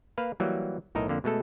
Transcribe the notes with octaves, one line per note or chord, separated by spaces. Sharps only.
A#3 B4 F5
E3 F#3 G3 A#3
B1 A2 D#4 A#4 D#5 E5
F2 D3 A#3
B2 G#3 A3 A4